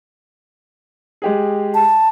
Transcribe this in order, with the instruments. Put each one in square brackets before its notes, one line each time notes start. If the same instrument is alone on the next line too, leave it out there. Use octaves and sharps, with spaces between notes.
[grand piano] G#3 G4 G#4
[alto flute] A5